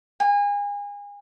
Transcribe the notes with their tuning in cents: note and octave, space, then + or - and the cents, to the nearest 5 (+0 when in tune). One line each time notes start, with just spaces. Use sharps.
G#5 -30